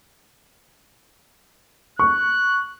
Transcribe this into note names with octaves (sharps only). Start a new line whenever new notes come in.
C#6 F#6